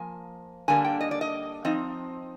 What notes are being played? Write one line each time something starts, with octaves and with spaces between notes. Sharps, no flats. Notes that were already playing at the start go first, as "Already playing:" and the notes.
Already playing: F3 A#3 G#5
D3 G3 A#3 D4 G#5
G5
D#5
D5
D#5
F3 C4 D#4 D#5